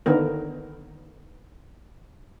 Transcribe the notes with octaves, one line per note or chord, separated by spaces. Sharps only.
D3 D#3 B3 A#4